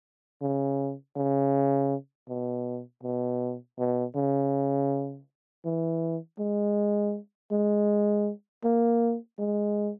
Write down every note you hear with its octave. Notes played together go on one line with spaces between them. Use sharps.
C#3
C#3
B2
B2
B2
C#3
E3
G#3
G#3
A#3
G#3